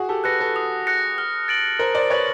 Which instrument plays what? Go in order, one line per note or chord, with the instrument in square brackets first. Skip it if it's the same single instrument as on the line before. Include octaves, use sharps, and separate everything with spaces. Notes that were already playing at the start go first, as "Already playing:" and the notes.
Already playing: [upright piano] F#4 G#4
G4 A4
[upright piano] A4 B4 [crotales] F#6 A#6 C#7
[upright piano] A4 B4
[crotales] D#6
F#6 A#6 C#7
F6
A6 D7 F#7
[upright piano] A#4 C5 [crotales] F6
[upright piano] C5 D5
[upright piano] B4 C#5 [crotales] A6 D7 F#7